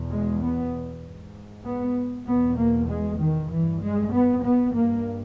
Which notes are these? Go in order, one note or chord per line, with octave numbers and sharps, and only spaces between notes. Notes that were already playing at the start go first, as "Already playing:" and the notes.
Already playing: E2 B2
G#3
B3
G#2
B3
E2 B2 B3
A#3
G#3
D#3
G2 E3
G#3
B3
B3
G2 A#3